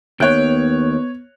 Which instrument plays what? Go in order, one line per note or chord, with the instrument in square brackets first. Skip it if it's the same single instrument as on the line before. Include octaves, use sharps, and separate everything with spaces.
[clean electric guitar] D#2 G5 [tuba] B3 [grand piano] C#5 F#6